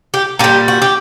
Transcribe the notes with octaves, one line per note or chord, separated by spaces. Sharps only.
G4
A#2 G3 G4
F#4
G4